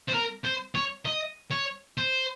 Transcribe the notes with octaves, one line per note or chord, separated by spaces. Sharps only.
C5
A#4
C5
C#5
D#5
C#5
C5